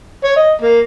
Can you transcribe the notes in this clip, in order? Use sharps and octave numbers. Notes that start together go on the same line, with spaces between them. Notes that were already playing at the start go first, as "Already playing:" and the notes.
C#5
D#5
A#3